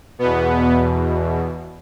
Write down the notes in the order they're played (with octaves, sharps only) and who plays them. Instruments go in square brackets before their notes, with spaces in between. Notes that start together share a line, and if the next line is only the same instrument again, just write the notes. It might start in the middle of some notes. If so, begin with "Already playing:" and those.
[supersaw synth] E2 B2 B3